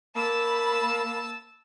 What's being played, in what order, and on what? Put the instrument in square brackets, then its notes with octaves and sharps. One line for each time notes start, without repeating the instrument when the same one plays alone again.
[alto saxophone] A#3 [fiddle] A5 E6 [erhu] B5